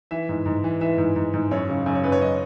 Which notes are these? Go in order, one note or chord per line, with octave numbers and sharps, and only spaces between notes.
E3 E5
G#2
G#2
E3
E3 E5
G#2
G#2
G#2
F#2 C#5
C#3
F#2
C#5
F#2 B4
C#5
D#5